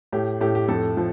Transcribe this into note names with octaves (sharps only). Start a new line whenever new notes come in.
A2 G4
A2 G4
G4
F2 A4
F3